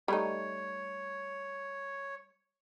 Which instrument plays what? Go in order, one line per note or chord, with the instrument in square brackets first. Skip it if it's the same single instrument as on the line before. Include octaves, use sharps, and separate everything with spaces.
[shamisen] G3 A3 D#4 [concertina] C#5